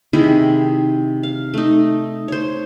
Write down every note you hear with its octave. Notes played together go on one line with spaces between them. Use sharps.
C3 D#3 E4 G#4
F5
A3 D#4
C5 C#5